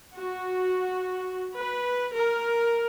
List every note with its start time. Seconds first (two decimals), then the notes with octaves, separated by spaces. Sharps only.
0.13 F#4
1.56 B4
2.13 A#4